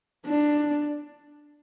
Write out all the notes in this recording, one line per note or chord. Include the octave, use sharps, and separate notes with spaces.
D4